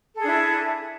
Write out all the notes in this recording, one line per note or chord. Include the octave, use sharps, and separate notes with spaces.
D4 E4 G#4 A4